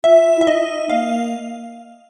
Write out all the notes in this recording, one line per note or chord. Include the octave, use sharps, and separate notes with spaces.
F4 E5
E4 E5
D#4 D#5
A#3 F5